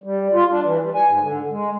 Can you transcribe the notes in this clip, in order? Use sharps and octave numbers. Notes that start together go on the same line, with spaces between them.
G3
F4
D4
E3
G3
G#5
G#2
D3
G#3